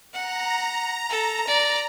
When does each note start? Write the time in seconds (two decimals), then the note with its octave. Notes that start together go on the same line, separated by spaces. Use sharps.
0.14 F#5 A#5
1.09 A4
1.47 D5